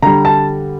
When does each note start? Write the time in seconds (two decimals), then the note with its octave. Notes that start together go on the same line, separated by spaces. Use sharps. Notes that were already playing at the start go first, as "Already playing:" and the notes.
0.02 D3 G3 A#5
0.25 A5